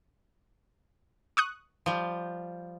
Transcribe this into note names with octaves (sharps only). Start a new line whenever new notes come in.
C#6 D#6 F#6
F3 G3